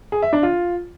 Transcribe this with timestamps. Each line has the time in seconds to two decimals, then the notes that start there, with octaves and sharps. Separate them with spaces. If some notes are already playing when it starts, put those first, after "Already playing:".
0.12 G#4
0.22 E5
0.33 D4
0.43 F4